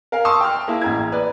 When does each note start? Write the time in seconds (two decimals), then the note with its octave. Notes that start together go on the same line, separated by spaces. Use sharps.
0.12 A#4 F5 G#5
0.25 A5 C6 C#6 D#6 E6
0.41 G5 A5 F6
0.68 A#3 E4 G#4
0.81 A1 A#5 G#6
1.12 B4 D5